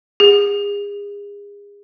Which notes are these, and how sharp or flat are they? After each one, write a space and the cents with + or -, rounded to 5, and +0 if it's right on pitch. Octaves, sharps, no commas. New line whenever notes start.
G#4 -35